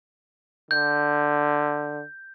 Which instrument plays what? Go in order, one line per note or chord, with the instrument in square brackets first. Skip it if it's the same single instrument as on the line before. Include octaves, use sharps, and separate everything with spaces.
[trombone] D3 [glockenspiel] G6